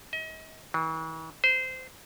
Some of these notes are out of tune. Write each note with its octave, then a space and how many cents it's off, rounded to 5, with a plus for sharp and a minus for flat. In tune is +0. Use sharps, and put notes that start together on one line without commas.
D#5 +35
E3 -40
C5 -20